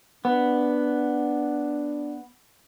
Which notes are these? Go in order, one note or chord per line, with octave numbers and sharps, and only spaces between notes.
B3 D4